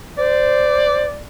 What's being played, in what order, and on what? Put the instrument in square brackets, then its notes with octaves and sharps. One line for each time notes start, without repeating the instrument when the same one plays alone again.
[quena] C5 [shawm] D5